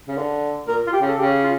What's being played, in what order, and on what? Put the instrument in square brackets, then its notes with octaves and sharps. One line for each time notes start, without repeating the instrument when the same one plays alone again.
[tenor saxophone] C#3
D3
[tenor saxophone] A#2 [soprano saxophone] A#4
[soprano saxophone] F4
G4
[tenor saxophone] C#3
[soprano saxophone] A4
[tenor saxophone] C#3 [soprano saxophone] G4
[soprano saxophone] F4